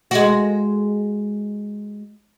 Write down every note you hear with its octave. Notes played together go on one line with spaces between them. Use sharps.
G#3 F#4